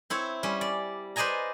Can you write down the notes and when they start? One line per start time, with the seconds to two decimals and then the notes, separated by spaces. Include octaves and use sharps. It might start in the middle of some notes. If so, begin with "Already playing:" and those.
0.10 C4 E4 C#5
0.43 G3 C#4
0.61 D5
1.16 B4 C5 D5 D#5 G#5 A#5